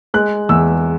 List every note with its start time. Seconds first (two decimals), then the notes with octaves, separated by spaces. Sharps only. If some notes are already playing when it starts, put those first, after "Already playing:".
0.14 G#3 F#6
0.49 E2 E6